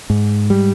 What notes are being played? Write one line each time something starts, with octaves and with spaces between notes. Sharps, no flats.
G#2
G3